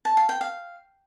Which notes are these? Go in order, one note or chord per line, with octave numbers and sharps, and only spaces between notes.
A5
F5
G5
F5